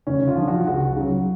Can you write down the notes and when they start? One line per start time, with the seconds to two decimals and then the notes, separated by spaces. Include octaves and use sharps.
0.07 D2 C#4
0.27 F4
0.36 D3 F3
0.48 F#4
0.67 C#2 F#4
0.96 C#3 F#3